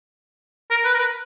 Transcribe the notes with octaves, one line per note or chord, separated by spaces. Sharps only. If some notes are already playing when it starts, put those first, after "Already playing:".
A#4
B4
A#4
B4